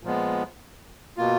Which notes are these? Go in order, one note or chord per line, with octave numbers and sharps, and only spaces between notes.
A#2 F3 G#3 B3
B2 A#3 F4